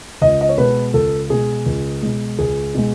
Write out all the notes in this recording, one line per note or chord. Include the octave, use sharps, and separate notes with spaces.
C#2 D#5
D#5
C#5
B2 G#3 B4
C#2 A4
B2 G#3 G#4
C#2
B2 G#3
C#2 G#4
B2 G#3